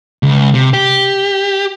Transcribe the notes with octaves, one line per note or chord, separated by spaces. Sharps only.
C#2
C3
G4